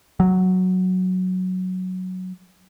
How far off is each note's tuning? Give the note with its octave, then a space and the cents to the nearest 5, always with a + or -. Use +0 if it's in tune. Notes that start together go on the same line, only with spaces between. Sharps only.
F#3 +0